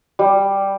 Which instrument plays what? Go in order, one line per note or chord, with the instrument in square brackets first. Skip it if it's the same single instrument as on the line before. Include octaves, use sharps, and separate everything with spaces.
[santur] G3